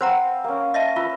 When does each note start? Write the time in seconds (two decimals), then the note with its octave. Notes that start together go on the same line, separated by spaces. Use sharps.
0.01 C4 B4 C5 F5 F#5 A#5
0.44 A#3 C#4
0.74 D#5 E5 A5
0.96 F4 B4 E5 A#5